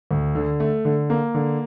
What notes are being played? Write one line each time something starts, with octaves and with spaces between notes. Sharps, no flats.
D2
D3
A3
D3
A#3
D3